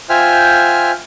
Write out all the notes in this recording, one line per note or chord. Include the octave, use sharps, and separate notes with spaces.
F4 C5 E5 G5 G#5 F6